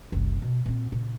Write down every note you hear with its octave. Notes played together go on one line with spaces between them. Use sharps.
F#1 C2
B2
A#2 C4
A#2 C#3